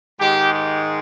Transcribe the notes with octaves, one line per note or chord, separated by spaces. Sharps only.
G#2 D#3 G#3 G4
G4